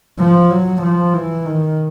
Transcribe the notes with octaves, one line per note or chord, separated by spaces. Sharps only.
F3
F#3
F3
E3
D#3